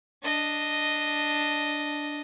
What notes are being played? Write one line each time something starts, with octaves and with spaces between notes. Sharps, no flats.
D4 D#5